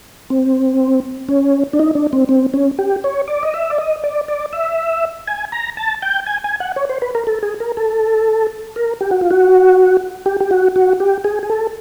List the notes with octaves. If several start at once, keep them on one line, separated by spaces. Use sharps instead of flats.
C4
C#4
D4
D#4
D4
C4
C4
C#4
G4
C#5
D5
D#5
E5
D5
D#5
D5
D5
E5
G#5
A#5
A5
G5
G#5
G#5
F#5
C#5
C5
B4
A#4
A4
G#4
A#4
A4
A#4
G4
F#4
F4
F#4
G4
G4
F#4
F#4
G4
G#4
G#4
A4